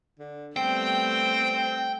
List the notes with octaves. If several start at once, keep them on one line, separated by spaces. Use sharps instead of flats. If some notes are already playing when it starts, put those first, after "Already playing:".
D3
G3 A3 B3 C4 G5